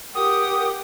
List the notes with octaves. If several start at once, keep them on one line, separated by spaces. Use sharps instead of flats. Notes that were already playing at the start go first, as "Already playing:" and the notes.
G4 A#4 F#5 G5 D#6